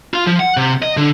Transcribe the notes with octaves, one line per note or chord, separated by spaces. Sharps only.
F4
F3
F#5
C3
D#5
D3